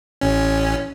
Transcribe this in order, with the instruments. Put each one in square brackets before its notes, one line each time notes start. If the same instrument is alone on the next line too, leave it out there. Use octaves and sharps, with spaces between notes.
[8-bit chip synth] A1 C#4